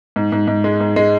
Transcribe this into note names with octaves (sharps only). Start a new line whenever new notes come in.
G#2
G#2
G#2
G#3
G#2
G#3